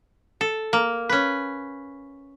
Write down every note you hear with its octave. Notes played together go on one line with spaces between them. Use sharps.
A4
A#3
C#4 B4